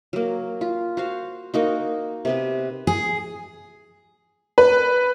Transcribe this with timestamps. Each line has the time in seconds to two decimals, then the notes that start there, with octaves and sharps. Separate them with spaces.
0.13 F#3 A#3
0.61 F4
0.97 F#4 C5 F5
1.54 A#3 D#4 F#4
2.25 C3 B3 B4
2.87 G#4
4.58 B4